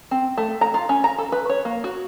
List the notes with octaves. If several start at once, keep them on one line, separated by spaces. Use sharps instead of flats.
C4
A3
A#5
F4
C#4
A#5
A4
B4
C#5
A#3
F#4